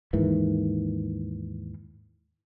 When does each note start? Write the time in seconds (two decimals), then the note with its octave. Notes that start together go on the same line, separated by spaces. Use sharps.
0.13 D#2 G#2 D#3 E3